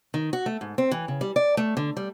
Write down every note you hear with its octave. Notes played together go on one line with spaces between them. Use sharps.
D#3
F#4
A3
G#2
C4
E3
C#3
G3
D5
A3
D3
G3